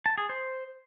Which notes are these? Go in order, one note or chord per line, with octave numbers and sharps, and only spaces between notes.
A5
G#4
C5